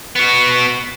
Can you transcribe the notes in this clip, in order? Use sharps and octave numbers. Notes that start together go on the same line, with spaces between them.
B3 F#4